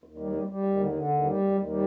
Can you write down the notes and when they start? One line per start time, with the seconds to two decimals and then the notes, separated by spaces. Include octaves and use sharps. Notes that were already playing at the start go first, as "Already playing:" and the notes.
0.04 D#2
0.18 G3
0.32 G3
0.47 G3
0.63 D#2
0.77 D3
0.92 D3
1.07 D#2
1.22 G3
1.37 D#2
1.51 D#2
1.66 G3